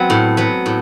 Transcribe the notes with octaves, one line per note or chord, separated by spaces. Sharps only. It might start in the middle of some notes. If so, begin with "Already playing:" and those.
Already playing: F#3 B3 C4
A2
F#3 B3
A2